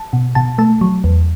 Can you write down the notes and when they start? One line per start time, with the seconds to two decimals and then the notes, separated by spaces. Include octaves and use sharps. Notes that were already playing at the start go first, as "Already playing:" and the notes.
Already playing: A5
0.13 B2
0.35 B2 A5
0.58 A3 A5
0.81 F#3
1.04 E2